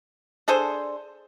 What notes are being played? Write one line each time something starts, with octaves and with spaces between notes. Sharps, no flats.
D4 G#4 A4 C5